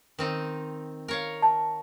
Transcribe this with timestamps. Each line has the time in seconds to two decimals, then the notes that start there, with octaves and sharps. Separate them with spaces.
0.19 D#3 C4 D#4
1.08 A#4 C#5 F5
1.42 A5